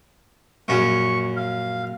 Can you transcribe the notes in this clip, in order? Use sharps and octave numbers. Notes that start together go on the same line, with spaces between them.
A#1 F#2 C#4 C#6
F5